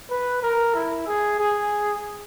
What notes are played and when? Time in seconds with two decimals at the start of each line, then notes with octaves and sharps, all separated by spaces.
0.10 B4
0.43 A#4
0.74 E4
1.07 G#4
1.39 G#4